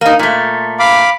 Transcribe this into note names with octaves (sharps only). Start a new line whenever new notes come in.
A#3 D#4
A#2 A3
F5 B5 D6